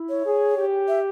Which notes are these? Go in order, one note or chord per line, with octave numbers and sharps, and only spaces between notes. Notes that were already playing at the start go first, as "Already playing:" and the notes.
Already playing: E4
C#5
G#4
G4
E5